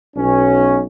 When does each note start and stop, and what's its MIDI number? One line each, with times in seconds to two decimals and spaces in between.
0.17 0.82 35
0.17 0.82 61